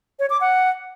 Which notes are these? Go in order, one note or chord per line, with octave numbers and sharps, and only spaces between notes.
C#5
D6
F#5